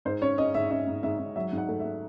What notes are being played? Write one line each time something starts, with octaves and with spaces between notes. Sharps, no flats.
G#2 C5
C#4 C#5
C#4 D#5
G#2 E5
C#4 E5
G#2
G#2 E5
G#2
F#3 E5
G#2
F#5
A3
E5
A3